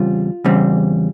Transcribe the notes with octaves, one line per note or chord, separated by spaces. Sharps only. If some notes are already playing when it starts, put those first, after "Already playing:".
Already playing: E2 C#3 G3 C4 F4
E2 C#3 G3 C4